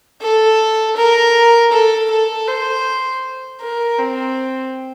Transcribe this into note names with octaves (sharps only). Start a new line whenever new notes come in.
A4
A#4
A4
A4
C5
A#4
C4